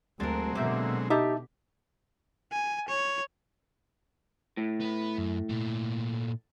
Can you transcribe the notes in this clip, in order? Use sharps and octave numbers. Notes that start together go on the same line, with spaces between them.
D2 F#3 G#3 C4 D4 A#4
B2 D3 A#3 E5 G6
D#4 G4 E5 A5
G#5
C#5
A2
B3 B4
F#2
A#2 A3